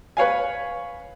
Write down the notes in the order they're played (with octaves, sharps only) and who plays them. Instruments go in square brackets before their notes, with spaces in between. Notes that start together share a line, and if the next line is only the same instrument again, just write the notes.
[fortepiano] B4 C#5 F5 G#5